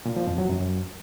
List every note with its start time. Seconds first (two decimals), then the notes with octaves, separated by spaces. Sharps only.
0.06 A#2
0.16 F3
0.27 F2
0.38 F#3
0.49 F#2